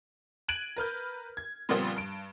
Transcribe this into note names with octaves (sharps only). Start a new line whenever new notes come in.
F#6 G#6 D7 D#7 F#7
A#4 B4 F6 G6
G#6
A#2 C#3 F3 G3 B3 C4
G2 D7